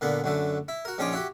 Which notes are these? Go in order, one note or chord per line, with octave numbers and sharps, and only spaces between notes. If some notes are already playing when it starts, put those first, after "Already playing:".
A#2 D3 A#3 B3
F#2 D3 A3
E4
F#4 A#4
A#1 C#4 D#4 F4 C#5 D6
E4 F#4 G4